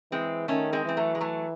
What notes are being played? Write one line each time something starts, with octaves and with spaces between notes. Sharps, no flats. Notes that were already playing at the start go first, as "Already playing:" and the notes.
E3 G#3 C4
D#3 A3 C#4
G#3 C4
E3 C4
F#3 A3
G#3
F#3 A3